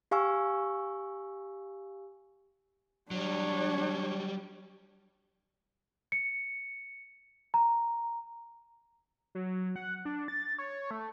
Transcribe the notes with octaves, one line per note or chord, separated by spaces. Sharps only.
G4 F5 G#5 C#6 E6
F#3 G3 D4 C#5
C#7
A#5
F#3
F#5
D4
A6
C#5
A3